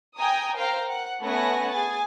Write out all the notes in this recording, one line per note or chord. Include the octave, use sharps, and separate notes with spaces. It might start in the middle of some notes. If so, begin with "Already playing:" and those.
G5 G#5 A#5 D#6
A#4 C5 F5 G5 A#5
F#5
A3 B3 C#4 F#5 G#5 A#6
G#4 G#5 A6